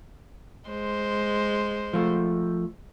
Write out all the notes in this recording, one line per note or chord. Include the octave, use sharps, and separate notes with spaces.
G#3 C5
F3 A3